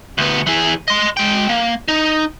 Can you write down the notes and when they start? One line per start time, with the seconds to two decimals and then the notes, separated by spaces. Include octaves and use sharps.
0.18 D2 B3
0.47 E3 G#4
0.88 D#5 C6
1.17 G#3 G5
1.49 A#3
1.88 D#4